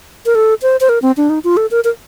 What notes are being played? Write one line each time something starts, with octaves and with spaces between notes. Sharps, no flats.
A#4
A4
C5
C5
A#4
C4
D4
D#4
F4
A4
A#4
A#4